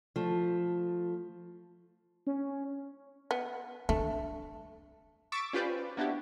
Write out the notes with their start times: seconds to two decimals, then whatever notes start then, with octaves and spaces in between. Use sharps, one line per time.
0.16 F3 A3
2.27 C#4
3.31 B3
3.89 A3 D4
5.32 C#6 D6 E6 A6 B6 D7
5.53 C#4 F4 G4 B4 C5 D5
5.97 A#3 B3 D4 E4 F#4 G4